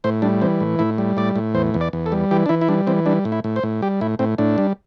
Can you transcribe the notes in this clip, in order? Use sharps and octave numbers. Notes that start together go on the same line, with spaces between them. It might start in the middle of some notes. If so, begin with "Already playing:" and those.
A2 C5
G3 D4
E3 C4
A2
A2 E4
G3
A2 D5
A2
E2 C5
E2
D5
E2
A4
G3
E3 G4
D4
E3 E4
E4
G3 D4
E3 C4
G3 D4
A2
E4
A2
C5
A2
G3 G4
A2 E4
A2 C4
A2 D4
G3